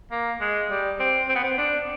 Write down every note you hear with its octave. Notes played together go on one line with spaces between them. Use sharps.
A#3
G#3
G3
C4
C4
B3
C4
D4